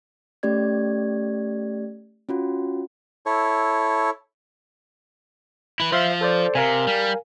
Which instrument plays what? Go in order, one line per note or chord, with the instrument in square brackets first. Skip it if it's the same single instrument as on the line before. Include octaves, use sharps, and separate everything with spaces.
[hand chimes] A3 C#4 G4 D5 G#6
C#4 F4 F#4
[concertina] E4 A4 C#5
[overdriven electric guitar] E4 B4
[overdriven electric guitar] F3 F4 [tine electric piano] C5 E5 F5
[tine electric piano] A4 C5 D5
[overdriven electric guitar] C3 [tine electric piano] A#4 F5 G#5
[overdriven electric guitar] G3